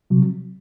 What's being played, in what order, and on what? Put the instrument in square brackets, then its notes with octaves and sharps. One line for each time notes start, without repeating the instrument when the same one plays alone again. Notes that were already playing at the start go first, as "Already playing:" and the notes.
[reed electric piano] C3 F#3